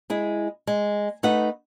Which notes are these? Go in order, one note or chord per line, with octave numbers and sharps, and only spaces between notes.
G#3 E4 G#4
G#3
A3 D#4 B4 F#5